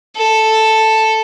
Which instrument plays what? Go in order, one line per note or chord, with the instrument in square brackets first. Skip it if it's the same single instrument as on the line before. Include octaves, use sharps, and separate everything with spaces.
[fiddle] A4